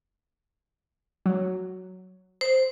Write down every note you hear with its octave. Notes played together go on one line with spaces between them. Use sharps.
F#3
C5